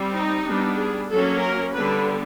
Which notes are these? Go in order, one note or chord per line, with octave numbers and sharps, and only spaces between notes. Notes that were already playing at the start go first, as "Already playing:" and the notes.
Already playing: G3 C4
D#4
G3 B3 D4
G#4
F#3 A#3 C#4 A4
A#4
D3 G3 B3 D4 B4